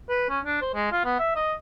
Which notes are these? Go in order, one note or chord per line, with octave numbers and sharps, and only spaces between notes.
B4
C#4
D4
C5
G#3
F4
B3
E5
D#5